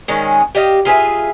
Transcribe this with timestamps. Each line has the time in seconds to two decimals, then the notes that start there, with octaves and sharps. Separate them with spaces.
0.08 D#3 G#3 C#4
0.55 G4 D#5 F5
0.85 F4 G#4 B4 E5